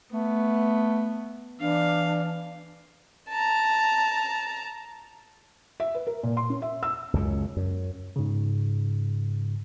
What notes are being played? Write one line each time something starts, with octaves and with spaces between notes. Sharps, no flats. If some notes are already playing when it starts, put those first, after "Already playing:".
A3 B3
E3 D4 F5
A5 A#5
E5
B4
A#4
A#2
C6
C#4
E5
E6
C#2 F#2 C#3
F#2
G#2 C#3